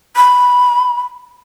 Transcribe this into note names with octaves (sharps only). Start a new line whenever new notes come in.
B5